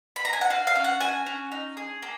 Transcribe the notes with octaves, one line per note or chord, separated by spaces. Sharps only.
B5
A#5
G#5
F#5
F#4 F5
F5
C#4
F#5
F#4 G#5
C#4
D#4
G#4
A#3